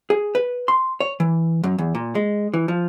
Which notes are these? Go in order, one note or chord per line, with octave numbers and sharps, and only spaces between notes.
G#4
B4
C6
C#5
E3
F#2
E2
A#2
G#3
E3
F3